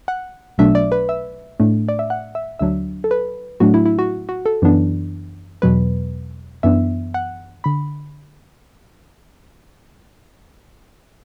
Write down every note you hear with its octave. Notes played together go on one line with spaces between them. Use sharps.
F#5
B1 B2 F#3 A3 D4 E5
D5
B4
E5
A2 A3 D4
D5
E5
F#5
E5
D2 D3 F#3 D4 E5
A4
B4
A2 F#3 A3 D4 F#4
E4
E4
F#4
F#4
A4
F#2 E3 B3 D4
E2 B2 F#3 B4
F#2 E3 B3 D4 E5
F#5
D3 B5